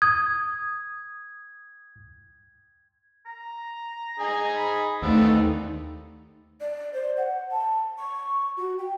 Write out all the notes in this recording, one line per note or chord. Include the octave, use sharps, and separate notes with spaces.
D#6 G#6
A#5
D#4 G#4 G#5
B5
D#2 A3 B3 C4 D4 D#4 E6
D5
C5
F#5
A5
C#6
F#4
G5